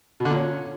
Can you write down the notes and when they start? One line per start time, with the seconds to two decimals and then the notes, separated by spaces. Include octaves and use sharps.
0.20 B2
0.25 D3
0.30 A#2
0.35 C#4